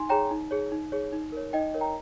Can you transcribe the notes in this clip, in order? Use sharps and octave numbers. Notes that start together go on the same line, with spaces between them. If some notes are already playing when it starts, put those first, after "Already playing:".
Already playing: D#4 G#5 C6
G#4 C#5 G5 A#5
D#4
G#4 C#5
D#4
G#4 C#5
D#4
A#4 C#5
D#4 D#5 G5
A#4 C#5
G5 A#5